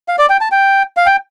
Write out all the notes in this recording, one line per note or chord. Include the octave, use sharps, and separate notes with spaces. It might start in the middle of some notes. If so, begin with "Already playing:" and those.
F5
D5
G5
A5
G5
F5
G5